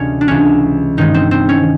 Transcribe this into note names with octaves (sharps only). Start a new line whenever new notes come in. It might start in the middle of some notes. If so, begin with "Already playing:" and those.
Already playing: D2 C3 E3 G#3 B3 C#4
D4
C#2 C3 E3 C#4
G2 D#3 G#3 D#4
C4
C4
C#4